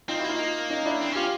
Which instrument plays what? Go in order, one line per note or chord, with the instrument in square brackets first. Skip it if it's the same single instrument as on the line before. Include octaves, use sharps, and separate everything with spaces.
[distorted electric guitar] C4 [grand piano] D#4 F4
[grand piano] E4 F#4
[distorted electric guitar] A#3 [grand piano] D#4 F4
[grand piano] C#4 D#4
D4 E4
[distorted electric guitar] C4
[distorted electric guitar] C#4 [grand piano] F4 G4